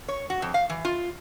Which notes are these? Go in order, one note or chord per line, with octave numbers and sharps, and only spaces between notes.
C#5
F#4
F2
F5
E3
F4